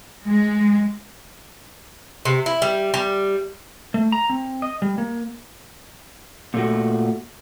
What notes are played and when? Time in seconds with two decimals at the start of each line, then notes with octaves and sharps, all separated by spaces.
0.24 G#3
2.25 C3
2.46 E4
2.62 G3
2.94 G3
3.94 A3
4.12 A#5
4.30 C4
4.62 D#5
4.82 G3
4.98 A#3
6.54 A#2 A3 F#4